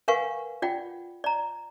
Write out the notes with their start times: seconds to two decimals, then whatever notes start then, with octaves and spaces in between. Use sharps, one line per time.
0.08 A#4 B4 F5 F#5 G#5 C#6
0.62 F4 D5 F#5 G5
1.24 D5 A#5